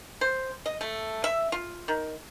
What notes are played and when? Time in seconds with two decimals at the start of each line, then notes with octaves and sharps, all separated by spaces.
0.21 C5
0.66 D#5
0.81 A3
1.24 E5
1.52 F4
1.88 D#3